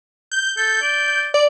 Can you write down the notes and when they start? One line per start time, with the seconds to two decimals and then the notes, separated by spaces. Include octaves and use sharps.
0.32 G6
0.57 A4 G6
0.82 D5
1.34 D5